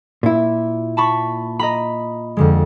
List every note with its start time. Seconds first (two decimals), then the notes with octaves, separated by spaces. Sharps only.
0.23 A#2 E4
0.97 A5 B5 C#6
1.59 D#5 A#5 B5
2.37 F2 D3 G#3